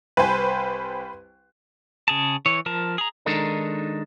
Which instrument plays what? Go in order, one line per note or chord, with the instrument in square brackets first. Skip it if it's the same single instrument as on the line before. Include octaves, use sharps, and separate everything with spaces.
[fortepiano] C2 G#5 [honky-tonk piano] B4 C5
[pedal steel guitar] C#3 G#4 A5
E3 C#5
F3 A#4 A5
G#4 A#5
[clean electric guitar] D#3 G#3 D4 D#4 A4 A#4